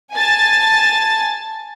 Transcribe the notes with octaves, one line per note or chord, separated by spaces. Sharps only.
G#5 A5 A6